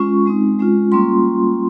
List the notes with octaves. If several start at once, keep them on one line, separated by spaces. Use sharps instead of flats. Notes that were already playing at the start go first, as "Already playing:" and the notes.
Already playing: G#3 C#4 F4 C#6
G#3 C4 D#4
G#3 C#4 F4
G3 A#3 C#4 F4 C6